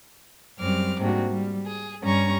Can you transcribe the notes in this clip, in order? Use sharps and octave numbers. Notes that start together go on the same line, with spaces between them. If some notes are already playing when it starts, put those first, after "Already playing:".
F#2 G3 C4 D6 F6
G#2 C3 G3 A#3 D4 F#4
G3
G#4
G2 G3 C#4 A#5 C#6